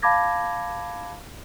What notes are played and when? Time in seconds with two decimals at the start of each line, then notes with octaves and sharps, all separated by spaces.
0.02 F5 A5 B5 D6 G#6 A#6